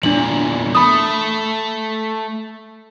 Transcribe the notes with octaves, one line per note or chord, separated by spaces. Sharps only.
E2 A#2 D4 F#7
A3 B5 D#6